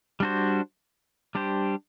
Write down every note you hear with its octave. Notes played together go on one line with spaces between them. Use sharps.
G3 D4 F#4 C5
G3 D4 G4 C5